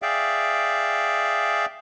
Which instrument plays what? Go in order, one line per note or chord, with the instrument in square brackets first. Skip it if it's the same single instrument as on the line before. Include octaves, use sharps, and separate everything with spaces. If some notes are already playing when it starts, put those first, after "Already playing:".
[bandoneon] G#4 D5 E5 F5 G5